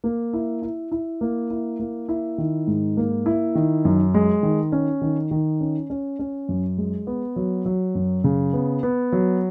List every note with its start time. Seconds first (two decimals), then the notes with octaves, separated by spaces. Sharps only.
0.04 A#3
0.33 E4
0.62 E4
0.92 E4
1.21 A#3
1.50 E4
1.79 A#3
2.09 E4
2.38 D#3
2.67 G#2
2.97 A#3
3.26 E4
3.55 D#3
3.85 F#2
4.14 G#3
4.43 D#3
4.72 C#4
5.01 D#3
5.31 D#3
5.61 C#4
5.90 C#4
6.19 C#4
6.48 F#2
6.78 G#3
7.07 B3
7.36 F#3
7.65 F#3
7.95 F#2
8.24 C#3
8.53 B3
8.83 B3
9.12 F#3